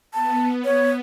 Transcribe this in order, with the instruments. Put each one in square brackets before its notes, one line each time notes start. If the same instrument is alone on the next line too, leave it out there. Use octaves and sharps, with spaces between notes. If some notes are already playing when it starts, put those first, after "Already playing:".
[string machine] B3 [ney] A5
[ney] C#5